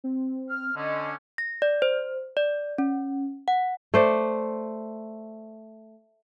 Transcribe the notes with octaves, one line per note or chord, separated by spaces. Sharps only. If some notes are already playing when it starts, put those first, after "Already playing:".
C4
F6
D3 C#4 D#5
A#6
D5
C5
D5
C#4
F#5
A3 C5 D5